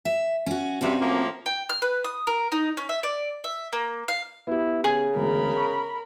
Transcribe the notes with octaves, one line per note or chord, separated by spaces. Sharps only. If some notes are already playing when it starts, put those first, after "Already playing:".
E5
C#4 F#4
G2 C3 C4 C#4 F#4
A2 F3 A#3
G5
F6
B4
D#6
A#4
D#4
C#4
E5
D5
E5
A#3
F5
B3 E4 G4
C#3 G#4
E1 D2 A#4 B5
C#6